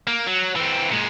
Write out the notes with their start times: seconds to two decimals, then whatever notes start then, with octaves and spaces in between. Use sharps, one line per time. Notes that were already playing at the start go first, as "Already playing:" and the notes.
0.07 A#3
0.27 F#3
0.56 E3 C4
0.91 A#2 G#3